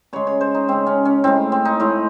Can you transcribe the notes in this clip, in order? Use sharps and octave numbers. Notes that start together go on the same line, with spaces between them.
C#3 G#3 C#5
C#5
C5
D#4
C#3 G#3 C4
C#4
C#4
A2 G#3 C4
C4
D#4
A2 G#3